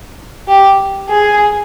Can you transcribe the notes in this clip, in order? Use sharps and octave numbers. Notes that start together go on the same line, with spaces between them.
G4
G#4